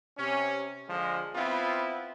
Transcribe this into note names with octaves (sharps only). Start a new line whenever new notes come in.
C3 C#4
D3 F3 G#3
B3 C4 E4 F4